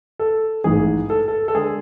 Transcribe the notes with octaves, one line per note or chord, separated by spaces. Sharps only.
A4
A1 G#2 E3 G#4
A4
A4
A4
D3 G#3 G#4